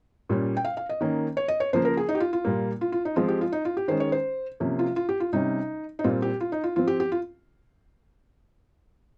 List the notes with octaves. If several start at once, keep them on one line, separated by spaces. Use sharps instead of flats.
A#2 G3 C#4
G5
F5
F5
D#5
D#3 A#3 C#4
C#5
D#5
C#5
C#3 F3 A#3 C5
A#4
G#4
D#4
G4
F4
F4
A#2 G3 A#3
F4
F4
D#4
F3 G#3 C4 F4
G4
F4
D#4
F4
G4
D#3 G#3 C#4 C5
C#5
C5
C3 F3 A#3 C#4
F4
F4
G4
F4
C3 G3 C#4 D#4
D#4
A#2 G3 C4 F4
G4
F4
D#4
F4
F3 C4 F4
G4
G4
F4